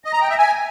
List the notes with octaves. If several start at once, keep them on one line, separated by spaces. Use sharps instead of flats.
D#5
A#5
G5
E5
G#5